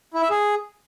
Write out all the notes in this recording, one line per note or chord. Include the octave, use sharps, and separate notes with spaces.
E4
E5
G#4